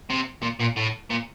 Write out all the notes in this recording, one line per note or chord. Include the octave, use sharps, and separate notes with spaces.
C3
A#2
A#2
A2
A#2